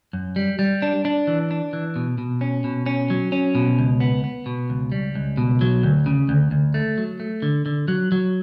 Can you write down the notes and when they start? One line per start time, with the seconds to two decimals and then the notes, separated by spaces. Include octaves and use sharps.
0.13 F#2
0.36 G3
0.59 G3
0.82 D4
1.05 D4
1.27 E3
1.51 D4
1.73 E3
1.96 B2
2.18 B2
2.41 C#4
2.64 B2
2.86 C#4
3.10 F#3
3.32 C#4
3.55 B2
3.79 C#2
4.00 B3
4.24 B3
4.46 B2
4.70 C#2
4.92 G3
5.15 C#2
5.37 B2
5.61 F#3
5.83 D2
6.06 C#3
6.29 D2
6.51 D2
6.74 A3
6.98 F#3
7.20 A3
7.42 D3
7.66 D3
7.88 F#3
8.12 F#3